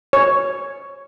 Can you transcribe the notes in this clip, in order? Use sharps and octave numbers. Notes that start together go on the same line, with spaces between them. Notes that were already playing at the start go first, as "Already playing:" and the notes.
C#5